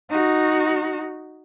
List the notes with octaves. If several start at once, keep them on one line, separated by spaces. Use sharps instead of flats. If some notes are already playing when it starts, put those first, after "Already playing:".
D#4 F#4